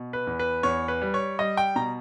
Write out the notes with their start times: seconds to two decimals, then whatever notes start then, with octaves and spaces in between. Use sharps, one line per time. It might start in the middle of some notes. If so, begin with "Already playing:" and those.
Already playing: B2
0.13 B4
0.27 E2
0.40 B4
0.63 E2 C#5
0.88 B4
1.02 G3
1.14 C#5
1.39 G3 D#5
1.57 G5
1.76 B2 A#5